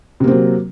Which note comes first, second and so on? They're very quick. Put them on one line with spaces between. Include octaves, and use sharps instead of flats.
C3 A#3 C4 F#3